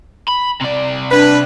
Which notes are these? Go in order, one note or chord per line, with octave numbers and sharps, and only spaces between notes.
B5
C3 D5
D4 B4